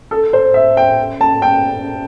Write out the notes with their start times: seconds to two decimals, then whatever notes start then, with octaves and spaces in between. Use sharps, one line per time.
0.11 A4
0.33 C5
0.54 E5
0.77 G5
1.21 A5
1.42 G5